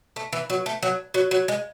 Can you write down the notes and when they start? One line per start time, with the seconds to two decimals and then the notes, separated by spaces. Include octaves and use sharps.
0.16 A3
0.33 E3
0.50 F#3
0.66 A3
0.83 F#3
1.14 F#3
1.31 F#3
1.48 G#3